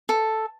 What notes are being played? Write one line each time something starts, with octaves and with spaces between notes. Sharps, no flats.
A4